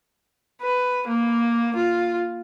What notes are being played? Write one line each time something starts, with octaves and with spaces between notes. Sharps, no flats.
B4
A#3
F4